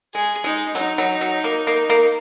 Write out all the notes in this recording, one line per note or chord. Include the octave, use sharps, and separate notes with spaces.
G#3 G#4
G#3 D#4
F#3 D#4
F#3
F#3
A#3
A#3
A#3